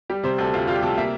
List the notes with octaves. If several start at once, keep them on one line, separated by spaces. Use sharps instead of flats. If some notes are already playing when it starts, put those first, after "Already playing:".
G3 G4
C3 C5
D2 A4
D2 F4
G3 F4
G4
C3 A4
A#3 E5